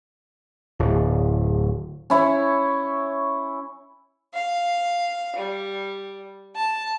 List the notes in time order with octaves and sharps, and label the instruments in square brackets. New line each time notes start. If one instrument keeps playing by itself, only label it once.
[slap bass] D1
[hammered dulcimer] C#4 E4 C#5
[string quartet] F5
G3
A5